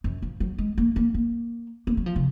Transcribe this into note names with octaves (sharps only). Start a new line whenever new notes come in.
F#2
F3
F#3
G#3
A#3
A#3
A#3
A#3
F#3
F3
C#3